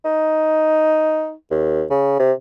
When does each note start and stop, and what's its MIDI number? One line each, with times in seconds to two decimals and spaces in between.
0.05 1.32 63
1.51 1.84 39
1.90 2.15 49
2.19 2.32 48